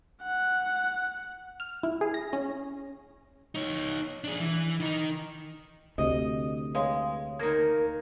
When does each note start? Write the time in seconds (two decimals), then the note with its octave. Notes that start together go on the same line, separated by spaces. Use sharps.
0.23 F#5
1.60 F6
1.83 E4
2.01 G#4
2.14 A#6
2.33 C#4
3.55 D#4 C#5
4.24 D4 G#4
4.40 E3
4.80 D#3 D#4
5.98 D2 C3 D#5
6.75 G#3 B4 C#5 F5
7.39 D#3 A#3 A#4 G#6 A#6